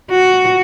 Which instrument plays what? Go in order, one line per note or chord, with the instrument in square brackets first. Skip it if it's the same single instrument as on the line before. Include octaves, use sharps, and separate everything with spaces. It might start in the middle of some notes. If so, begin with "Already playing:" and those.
[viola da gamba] F#4